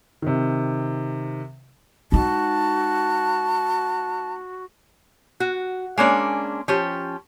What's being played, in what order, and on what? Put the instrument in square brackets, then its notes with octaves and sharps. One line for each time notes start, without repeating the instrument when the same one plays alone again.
[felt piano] C3 D#3
[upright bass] G#3 D#4 [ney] F#4 [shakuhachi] A5
[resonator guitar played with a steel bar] F#4
G#3 A#3 C#4 D4
F3 C#4 G4